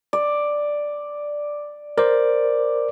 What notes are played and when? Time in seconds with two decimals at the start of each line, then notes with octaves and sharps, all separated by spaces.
0.13 D5
1.98 A#4 C5 D5